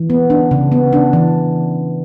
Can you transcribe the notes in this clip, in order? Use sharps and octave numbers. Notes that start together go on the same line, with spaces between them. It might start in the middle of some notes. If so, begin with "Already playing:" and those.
Already playing: E3
B3
D4
C#3
B3
D4
E3